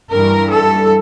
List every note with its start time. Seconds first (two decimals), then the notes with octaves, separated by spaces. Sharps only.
0.11 G2 E3 A#4
0.50 A4